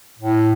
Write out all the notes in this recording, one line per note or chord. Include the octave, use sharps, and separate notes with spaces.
A2